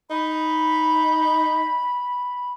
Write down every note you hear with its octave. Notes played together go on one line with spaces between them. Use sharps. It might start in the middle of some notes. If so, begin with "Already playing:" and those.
D#4 B5